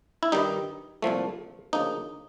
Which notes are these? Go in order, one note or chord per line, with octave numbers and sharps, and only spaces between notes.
E4
G2 D#3 G3 D#4
C2 A#2 F3 A3
D2 C#3 F3 A#3 D#4